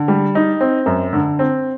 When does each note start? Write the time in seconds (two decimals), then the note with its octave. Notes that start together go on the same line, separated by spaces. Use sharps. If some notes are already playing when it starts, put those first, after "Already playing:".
Already playing: D3
0.08 G3
0.35 D#4
0.61 C4
0.86 F#2
1.13 D3
1.39 C4